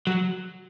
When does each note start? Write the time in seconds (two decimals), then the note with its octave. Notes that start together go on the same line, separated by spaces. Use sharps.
0.07 F#3